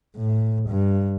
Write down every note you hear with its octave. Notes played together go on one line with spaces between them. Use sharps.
A2
G2